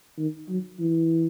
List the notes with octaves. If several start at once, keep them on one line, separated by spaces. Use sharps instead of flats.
D#3
F#3
E3